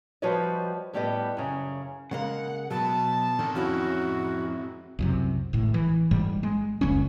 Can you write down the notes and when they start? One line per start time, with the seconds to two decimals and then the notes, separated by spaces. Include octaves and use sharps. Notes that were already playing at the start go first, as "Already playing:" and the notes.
0.22 F3 G3 F#4 B4 C#5 D#5
0.93 A2 G3 B3 G4 D5 D#5
1.37 F#2 C#3
2.11 C#3 G#3 A#3 F#5
2.71 B2 F#3 B3 A5
3.39 D3 D#3 C4 G#4 A#4
3.55 F2 C#4 E4 F#4
4.99 C2 F#2 C3
5.53 G#1 A2
5.74 E3
6.11 G#1 G#2 G3
6.43 G#3
6.81 F1 C#2 G3 C#4